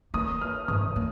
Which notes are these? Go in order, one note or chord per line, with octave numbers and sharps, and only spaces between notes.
A#3 D#6
F6
G#2 D#6
A#3